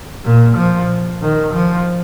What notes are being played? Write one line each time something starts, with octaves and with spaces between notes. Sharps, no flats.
A#2
F3
D#3
F3